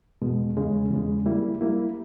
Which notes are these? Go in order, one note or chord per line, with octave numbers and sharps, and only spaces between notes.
E2 B2 G#3
E2 C#3 G#3
E2 C#3 G#3
G3 A#3 E4
G3 A#3 E4